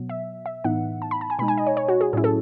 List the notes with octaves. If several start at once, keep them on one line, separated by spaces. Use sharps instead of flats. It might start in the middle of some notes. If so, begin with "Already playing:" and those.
Already playing: B2 F#3 B3
E5
E5
A2 E3 B3 D#4 F#5
A5
B5
A5
G#5
B2 G#3 D#4 B5
G#5
D#5
C#5
C#5
F#4
G#4
A2 F#3 C#4 E4 G#4
A4